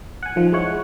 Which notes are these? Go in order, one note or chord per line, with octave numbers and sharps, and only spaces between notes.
F#5 G#5
D#3 F3
G#3 E4 C#5 F#5